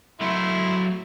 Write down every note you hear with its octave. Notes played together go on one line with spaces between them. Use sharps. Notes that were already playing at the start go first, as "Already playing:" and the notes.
F#3 A3 E4 C6